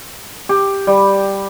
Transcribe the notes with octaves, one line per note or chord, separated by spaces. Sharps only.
G4
G3